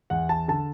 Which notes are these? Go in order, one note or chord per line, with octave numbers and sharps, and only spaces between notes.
E2 F#5
A5
D3 A5